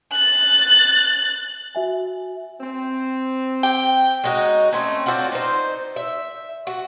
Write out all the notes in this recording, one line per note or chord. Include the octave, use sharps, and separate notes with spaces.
F#6 A6
F#4 E5 G#5
C4
G5
G#3 C#4 D#4 F#4
A3 C4 C#4
C4 D4 F4 F#4
D#4 C5
E5
F#4